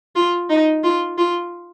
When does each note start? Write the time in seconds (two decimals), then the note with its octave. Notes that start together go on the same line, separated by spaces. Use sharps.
0.15 F4
0.49 D#4
0.83 F4
1.18 F4